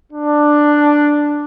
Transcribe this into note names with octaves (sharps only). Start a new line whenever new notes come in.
D4